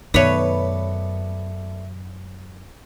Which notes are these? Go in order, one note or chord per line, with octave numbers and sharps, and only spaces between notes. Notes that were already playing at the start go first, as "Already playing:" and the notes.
F#2 B2 D#3 A3 B3 B4 C#5 D5